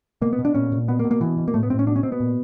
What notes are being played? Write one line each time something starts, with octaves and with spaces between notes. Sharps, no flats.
B2 A#3
B3
B2
D4
A#2 C#4
A#2
B2 B3
A#3
B2
A#3
B2 E3
B2
A#3
A2 A3
B3
A2 C4
C#4
B2 D4
C#4
B2 C4
B3
A#2